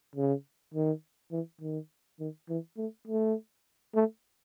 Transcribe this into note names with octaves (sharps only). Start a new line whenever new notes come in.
C#3
D#3
E3
D#3
D#3
E3
A3
A3
A3